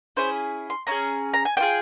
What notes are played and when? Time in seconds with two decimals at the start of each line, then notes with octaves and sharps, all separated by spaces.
0.17 C#4 E4 G#4 C5
0.70 C6
0.87 C#4 E4 A#5
0.91 G#4
1.34 A#5
1.45 G#5
1.57 A#3 G5
1.60 F4 G#4